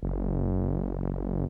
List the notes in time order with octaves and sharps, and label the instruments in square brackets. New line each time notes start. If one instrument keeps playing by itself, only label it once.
[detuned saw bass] F#1